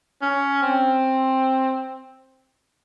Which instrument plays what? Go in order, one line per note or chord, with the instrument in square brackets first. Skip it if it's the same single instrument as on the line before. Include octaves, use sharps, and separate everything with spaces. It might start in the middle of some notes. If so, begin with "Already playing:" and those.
[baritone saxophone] C#4
C4